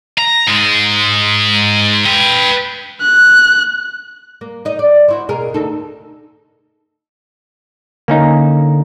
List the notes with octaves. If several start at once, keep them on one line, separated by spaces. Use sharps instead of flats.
A#5
G#2 G#3
B4 G5
F#6
A#3
D#4 D#5
D5
C4 E4 F#4
B2 G#4 A#4
D2 D#4 A4
D3 A#3 C#4 D#4